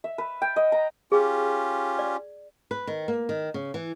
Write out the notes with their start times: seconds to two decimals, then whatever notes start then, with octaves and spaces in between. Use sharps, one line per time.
0.04 E5
0.18 B4
0.42 G5
0.56 D#5
0.72 A#5
1.12 C#4 F4 G4 G#4
1.99 D5
2.71 B4
2.87 D#3
3.08 A#3
3.29 D#3
3.54 C#3
3.74 E3